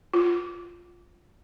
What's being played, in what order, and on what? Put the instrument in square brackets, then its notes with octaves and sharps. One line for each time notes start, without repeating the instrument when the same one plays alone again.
[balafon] F4